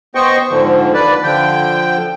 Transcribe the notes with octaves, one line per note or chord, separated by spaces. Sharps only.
B3 C5 D#5 G5 C#6
G#2 D3 F3
D#2 B4 D5
D3 F3 G5